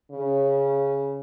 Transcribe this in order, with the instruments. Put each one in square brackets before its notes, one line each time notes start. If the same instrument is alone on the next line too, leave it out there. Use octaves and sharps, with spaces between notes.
[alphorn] C#3